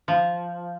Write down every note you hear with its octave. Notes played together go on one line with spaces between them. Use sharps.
F3